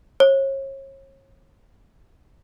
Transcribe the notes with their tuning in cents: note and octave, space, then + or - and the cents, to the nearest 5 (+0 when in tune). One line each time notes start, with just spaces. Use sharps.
C#5 -35